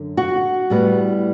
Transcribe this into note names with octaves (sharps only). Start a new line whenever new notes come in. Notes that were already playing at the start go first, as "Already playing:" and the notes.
Already playing: F#2 D3
F#4
A2 G3 B3